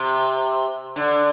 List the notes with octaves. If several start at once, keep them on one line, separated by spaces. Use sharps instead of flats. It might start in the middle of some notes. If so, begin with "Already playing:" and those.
Already playing: C3
D3